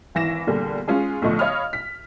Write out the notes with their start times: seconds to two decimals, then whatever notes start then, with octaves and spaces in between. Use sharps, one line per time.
0.15 G#1 E3 A#6 E7
0.47 E2 A#2 D3 G3
0.88 G#3 C#4 F4 G#4
1.22 B1 A2 D3 F3 D#5 C#6
1.39 C#5 D#5 F5 B5 D#6 F6
1.73 B6